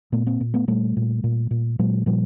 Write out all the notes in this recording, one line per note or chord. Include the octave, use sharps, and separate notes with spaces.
A#2 A3 B3
A#3 C4
A#2
A3 B3
A#2 G3 A3
A#2
A#2
A#2
A#2 F#3 G#3
A#2 F3 G3